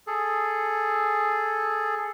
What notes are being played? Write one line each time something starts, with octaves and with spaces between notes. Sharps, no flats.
G#4 A4